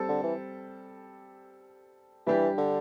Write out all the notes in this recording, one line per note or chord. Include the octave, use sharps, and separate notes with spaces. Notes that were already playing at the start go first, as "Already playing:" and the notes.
Already playing: G3 C4 A4
D3
E3
E3 G3 D4 G4
D3